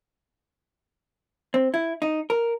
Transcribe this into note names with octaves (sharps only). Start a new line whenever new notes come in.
C4
E4
D#4
A#4